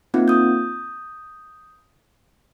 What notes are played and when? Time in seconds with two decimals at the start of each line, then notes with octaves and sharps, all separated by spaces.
0.14 A#3 C4 D#4 F4
0.28 D#6 G6